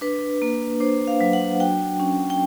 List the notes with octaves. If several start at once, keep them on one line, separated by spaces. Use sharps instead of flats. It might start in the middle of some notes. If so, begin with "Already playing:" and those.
D4 B4
A#3
D4 C5
F5
F#3
F#5
F#4 G5
C#4
G5